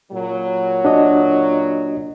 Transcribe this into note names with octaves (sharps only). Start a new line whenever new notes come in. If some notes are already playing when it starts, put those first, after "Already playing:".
A#2 C#3 F#3
D4 F#4 D#5